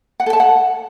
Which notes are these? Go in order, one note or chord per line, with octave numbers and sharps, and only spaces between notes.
F#5
A4
A5
F#5